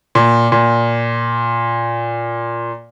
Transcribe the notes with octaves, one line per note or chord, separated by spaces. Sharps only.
A#2
A#2